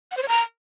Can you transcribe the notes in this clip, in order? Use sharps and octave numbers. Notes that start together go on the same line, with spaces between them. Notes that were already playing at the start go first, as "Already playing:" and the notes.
F#5
C5
C#5
A#5